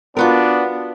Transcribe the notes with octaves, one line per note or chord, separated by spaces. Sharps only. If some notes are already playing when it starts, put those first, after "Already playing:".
B3 D4 F4 F#4 A#4